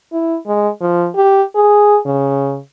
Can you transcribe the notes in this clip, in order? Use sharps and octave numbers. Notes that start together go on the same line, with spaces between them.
E4
G#3
F3
G4
G#4
C#3